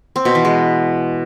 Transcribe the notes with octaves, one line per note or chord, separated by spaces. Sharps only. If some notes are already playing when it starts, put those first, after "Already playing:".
C4
B2
E3
G#3